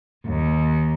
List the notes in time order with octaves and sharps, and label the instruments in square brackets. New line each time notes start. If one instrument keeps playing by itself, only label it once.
[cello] D#2